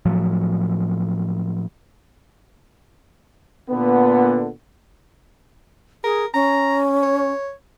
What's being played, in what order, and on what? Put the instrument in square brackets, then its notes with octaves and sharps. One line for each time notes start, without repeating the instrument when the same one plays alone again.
[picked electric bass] A2 F3 F#3
[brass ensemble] A#2 D3 B3
[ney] G#4 [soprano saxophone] A#4
[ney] C#4 [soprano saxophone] A#5
[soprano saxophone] C#5